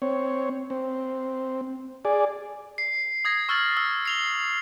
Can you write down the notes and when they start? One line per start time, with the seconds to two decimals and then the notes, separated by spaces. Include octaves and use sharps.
0.02 C4 C#5
0.70 C4
2.05 G#4 D5
2.78 C7
3.25 D#6 G#6 A#6
3.49 C#6 E6 F6 G#6 A6 F#7
3.77 E6
4.05 C7 F7 G7